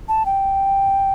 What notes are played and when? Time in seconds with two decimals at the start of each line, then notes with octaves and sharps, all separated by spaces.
0.08 A5
0.26 G5